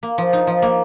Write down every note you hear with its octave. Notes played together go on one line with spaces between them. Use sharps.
A#3
F3
D#4
F3
A#3